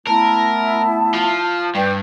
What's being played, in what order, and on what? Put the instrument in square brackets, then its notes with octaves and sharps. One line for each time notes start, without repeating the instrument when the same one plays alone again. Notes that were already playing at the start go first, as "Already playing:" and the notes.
[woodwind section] A3 B3 E4 [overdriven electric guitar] A#4 [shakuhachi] A5
[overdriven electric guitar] F3
[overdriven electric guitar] G2 [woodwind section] B4 D5 G5